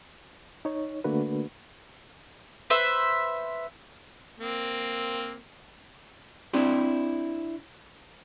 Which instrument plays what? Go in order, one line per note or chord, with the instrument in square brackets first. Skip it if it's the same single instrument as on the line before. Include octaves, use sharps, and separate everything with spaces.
[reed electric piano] D#4 C#5
D3 A3 A#3 D4 F#4 B4
[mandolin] B4 C5 E5
[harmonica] A#3 C4
[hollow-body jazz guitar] C4 D4 E4 G4